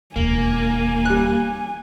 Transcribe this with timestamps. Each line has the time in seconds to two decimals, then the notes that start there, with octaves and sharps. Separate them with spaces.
0.16 E1 D#2 A#3 G#5
1.05 G3 F#6